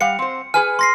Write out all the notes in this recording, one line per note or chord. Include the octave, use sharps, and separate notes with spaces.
G3 F5 F#5 C#7
C4 C5
G#4 B4 G#5 F6
C6 A#6 C7